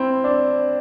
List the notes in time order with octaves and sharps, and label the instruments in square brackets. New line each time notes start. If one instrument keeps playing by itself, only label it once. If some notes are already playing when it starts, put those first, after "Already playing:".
Already playing: [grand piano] C4 E4
D4